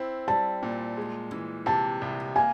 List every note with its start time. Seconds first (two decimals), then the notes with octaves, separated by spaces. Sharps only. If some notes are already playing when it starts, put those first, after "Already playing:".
Already playing: C4 E4
0.28 G3 A5
0.63 A#2
0.97 G#3
1.32 E3
1.66 C3 A5
2.02 C2
2.36 A#3 G#5